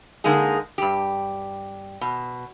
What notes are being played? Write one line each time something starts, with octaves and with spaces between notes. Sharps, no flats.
D3 G#3 A#3 D#4 G#4
G2 G4
B2